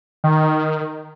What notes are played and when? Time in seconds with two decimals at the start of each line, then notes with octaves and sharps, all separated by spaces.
0.24 D#3